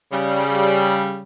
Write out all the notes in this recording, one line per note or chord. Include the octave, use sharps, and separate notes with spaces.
C#3 G3